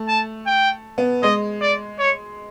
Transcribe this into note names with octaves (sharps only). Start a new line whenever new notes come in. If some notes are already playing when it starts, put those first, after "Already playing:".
Already playing: A3
A5
G5
B3
G#3 D#5
D5
C#5